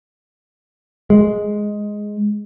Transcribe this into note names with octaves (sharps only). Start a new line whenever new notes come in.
G#3